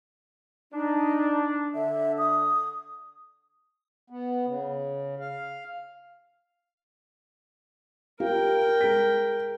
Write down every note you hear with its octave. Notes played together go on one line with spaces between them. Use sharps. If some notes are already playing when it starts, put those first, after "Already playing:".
D4 D#4
D3 E5
D#6
B3
C#3
F5
F4 G4 A#4 F5 G5
G#3 B6